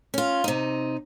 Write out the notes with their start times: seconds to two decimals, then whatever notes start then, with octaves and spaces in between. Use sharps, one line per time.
0.14 C#4 F4
0.44 C3 D#4